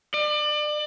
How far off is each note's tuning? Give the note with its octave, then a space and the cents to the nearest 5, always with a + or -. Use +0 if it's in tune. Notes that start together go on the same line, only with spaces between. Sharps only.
D5 +30